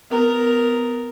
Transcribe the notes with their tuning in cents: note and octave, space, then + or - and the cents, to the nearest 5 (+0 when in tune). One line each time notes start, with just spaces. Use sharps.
B3 +20 A#4 +0